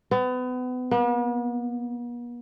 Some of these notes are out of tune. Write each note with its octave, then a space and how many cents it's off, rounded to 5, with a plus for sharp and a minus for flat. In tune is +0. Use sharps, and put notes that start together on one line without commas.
B3 +30
B3 -45